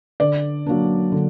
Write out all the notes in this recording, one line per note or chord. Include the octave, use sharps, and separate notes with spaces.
D3 D5
F#3 A#3 D4
D3